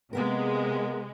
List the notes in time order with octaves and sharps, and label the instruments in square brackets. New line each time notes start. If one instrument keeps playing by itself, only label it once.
[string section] C3 G#3 [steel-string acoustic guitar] A#3 B3 A#4